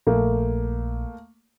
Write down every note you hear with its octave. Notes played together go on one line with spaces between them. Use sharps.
A#1 A3 A#3